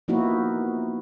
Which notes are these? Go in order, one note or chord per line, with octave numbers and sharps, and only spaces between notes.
F3 A#3 B3 D#4 E4 F#4